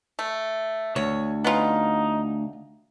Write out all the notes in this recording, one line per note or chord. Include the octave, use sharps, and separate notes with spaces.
A3
D2 C#5
B3 C#4 D#4 F4